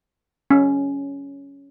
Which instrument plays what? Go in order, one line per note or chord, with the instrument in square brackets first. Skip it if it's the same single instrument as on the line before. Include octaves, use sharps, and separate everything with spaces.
[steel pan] C#4